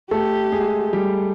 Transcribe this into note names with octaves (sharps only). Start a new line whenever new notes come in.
A3 G4 A4
G#3 G#4
G3 G4